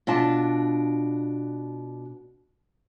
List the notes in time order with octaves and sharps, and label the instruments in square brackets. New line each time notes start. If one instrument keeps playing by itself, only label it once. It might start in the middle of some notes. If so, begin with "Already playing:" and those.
[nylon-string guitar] B2 D4 F4 A5